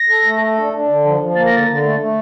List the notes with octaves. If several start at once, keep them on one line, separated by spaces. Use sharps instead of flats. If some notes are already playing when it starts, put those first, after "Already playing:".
Already playing: A#6
A4
A3
A4
D4
D4
D3
F3
F3
A#3 A6
A#6
D3
A6
D3
A3
A3